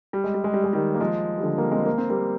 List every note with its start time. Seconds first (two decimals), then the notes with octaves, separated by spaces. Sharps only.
0.13 G3
0.24 G#3
0.34 G3
0.44 G#3
0.54 G3
0.64 G#3
0.73 D#3 G3
0.95 A#3
1.01 F3 G#3
1.38 G3
1.43 D3 F3
1.58 G3 A#3
1.72 G#3 C4
1.86 A#3
1.98 C4
2.10 G3 A#3